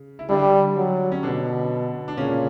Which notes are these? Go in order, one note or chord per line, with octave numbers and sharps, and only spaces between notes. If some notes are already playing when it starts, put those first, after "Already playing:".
Already playing: C#3
E4
D3 G3 D4
F#3
C#4
B2 D3 D4
D4
A#2 C#3 C#4